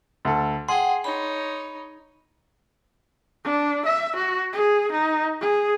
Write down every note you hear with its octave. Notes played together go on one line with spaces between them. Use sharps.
D2 A4
G#4 F#5 G5 C6
D#4 C#5 B5
D4
E5
F#4
G#4
D#4
G#4